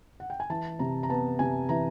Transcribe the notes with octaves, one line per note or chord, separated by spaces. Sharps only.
F#5
G5
G#5
E3 A5
C3 A#5
A#5
B3 A5
C3 G#5
E3 A#5